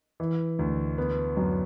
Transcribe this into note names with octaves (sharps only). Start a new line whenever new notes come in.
E3
D2
B3
F#2